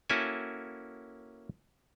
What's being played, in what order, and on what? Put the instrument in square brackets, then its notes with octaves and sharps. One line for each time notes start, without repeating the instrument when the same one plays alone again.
[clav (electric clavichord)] A#3 C#4 E4 F#4 A4 G#5